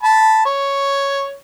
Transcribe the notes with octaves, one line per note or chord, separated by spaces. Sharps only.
A5 B5
C#5